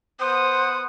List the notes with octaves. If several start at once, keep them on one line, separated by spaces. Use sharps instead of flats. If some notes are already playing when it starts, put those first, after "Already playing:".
B3 C5 F#5 D#6